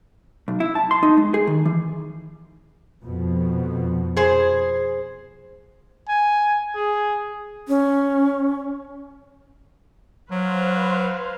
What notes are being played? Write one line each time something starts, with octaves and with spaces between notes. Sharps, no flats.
B1
E4
A5
C6
D#4
G#3
G#4
D#3
E3
F2 B2 F3
G#4 C5
G#5
G#4
C#4
F#3 B4 C5 F5